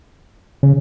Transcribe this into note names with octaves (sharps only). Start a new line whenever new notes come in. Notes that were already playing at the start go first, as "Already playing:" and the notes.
C#3